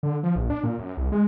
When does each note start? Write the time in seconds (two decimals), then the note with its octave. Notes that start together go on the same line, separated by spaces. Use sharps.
0.03 D3
0.23 F3
0.36 A#1
0.50 D4
0.63 A#2
0.79 F#2
0.97 C2
1.12 G#3